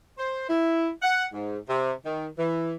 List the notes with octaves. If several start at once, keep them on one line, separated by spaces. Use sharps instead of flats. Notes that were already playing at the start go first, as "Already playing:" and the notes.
C5
E4
F#5
G#2
C3
D#3
E3